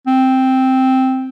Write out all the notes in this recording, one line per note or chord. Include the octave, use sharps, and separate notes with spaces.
C4